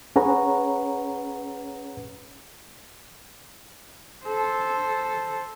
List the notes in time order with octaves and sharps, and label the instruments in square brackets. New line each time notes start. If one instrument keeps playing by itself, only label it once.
[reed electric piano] C#4 G#4 B4 C#5 F#5 A#5
[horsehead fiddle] A4 C5